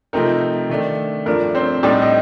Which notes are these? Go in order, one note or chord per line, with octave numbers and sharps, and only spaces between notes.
C3 F3 A3 C4 D#4 A#4
D#3 A3 D4
G2 F3 A3 D4 A#4
C4 C5
A2 G3 C4 D4 D#4 D5
D#4 D#5